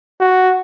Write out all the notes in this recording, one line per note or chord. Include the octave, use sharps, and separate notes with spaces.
F#4